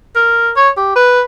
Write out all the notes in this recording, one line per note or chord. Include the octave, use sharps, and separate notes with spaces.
A#4
C#5
G4
B4